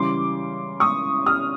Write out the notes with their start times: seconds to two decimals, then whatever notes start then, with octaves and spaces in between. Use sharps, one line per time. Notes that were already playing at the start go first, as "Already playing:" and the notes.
Already playing: C#3 E3 G3 C6 D6
0.80 C#6 D#6
1.26 D#6 F6